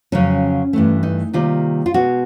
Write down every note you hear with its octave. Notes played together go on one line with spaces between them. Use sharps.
F2 C#3 F#3 C#4
G2 E3 A3
D#4
C3 D#3 G3 A#3 F4
F4
B2 G#3 B3 F#4